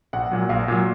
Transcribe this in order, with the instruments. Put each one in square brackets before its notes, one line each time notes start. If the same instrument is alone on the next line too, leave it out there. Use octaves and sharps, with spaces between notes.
[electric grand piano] A#1 [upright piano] F#5
[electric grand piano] A#2 F#3
[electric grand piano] A#1 [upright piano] F5
[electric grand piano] A#2 F#3